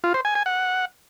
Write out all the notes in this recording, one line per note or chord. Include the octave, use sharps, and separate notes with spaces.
F4
C5
G#5
G#5
F#5